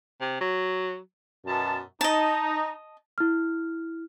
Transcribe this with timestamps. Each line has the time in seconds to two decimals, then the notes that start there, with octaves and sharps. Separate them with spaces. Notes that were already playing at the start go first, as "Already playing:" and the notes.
0.21 C3
0.41 F#3
1.45 F#2 B2 A5
2.01 D#4 D#5 A5
3.18 E4 F6